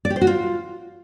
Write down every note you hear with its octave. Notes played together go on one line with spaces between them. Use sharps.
D5
G4
C5
F#4
F4